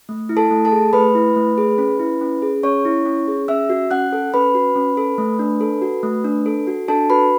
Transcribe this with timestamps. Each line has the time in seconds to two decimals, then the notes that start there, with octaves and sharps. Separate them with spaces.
0.09 A3
0.29 E4
0.37 A4 A5
0.51 A3
0.65 A4 A5
0.72 G#4
0.93 A3 B4 B5
1.15 E4
1.36 A3
1.58 G#4
1.78 C#4
2.00 E4
2.21 C#4
2.42 G#4
2.63 C#4 C#5 C#6
2.85 E4
3.06 C#4
3.28 G#4
3.48 C#4 E5 E6
3.70 F#4
3.91 C#4 F#5 F#6
4.13 A4
4.34 C#4 B4 B5
4.55 F#4
4.76 C#4
4.97 A4
5.18 A3
5.39 D4
5.61 A4
5.82 F#4
6.03 A3
6.25 D4
6.46 A4
6.67 F#4
6.88 D4 A4 A5
7.10 F#4 B4 B5